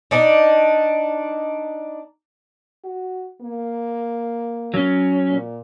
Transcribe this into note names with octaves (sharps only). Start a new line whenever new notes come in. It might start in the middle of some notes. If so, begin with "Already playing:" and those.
D4 D#4
F#4
A#3
F#3 C#4
A#2